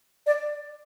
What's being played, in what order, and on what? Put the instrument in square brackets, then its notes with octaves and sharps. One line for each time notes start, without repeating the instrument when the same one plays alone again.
[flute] D5